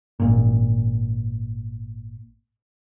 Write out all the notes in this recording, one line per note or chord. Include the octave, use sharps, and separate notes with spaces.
G#1 A#2